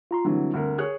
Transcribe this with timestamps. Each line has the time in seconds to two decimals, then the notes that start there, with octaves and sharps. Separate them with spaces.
0.11 F4 A#5 C6
0.25 D3 E3 F#3 G3 C4
0.54 D2 A#4
0.78 G#4 C#5 F#6